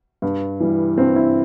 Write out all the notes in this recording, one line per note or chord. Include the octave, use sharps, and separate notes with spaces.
G2
E3 G3
G2 C4
E4